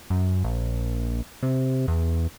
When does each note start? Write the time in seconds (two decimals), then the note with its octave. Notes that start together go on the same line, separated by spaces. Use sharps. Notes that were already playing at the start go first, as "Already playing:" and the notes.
0.10 F#2
0.44 A#1
1.43 C3
1.88 E2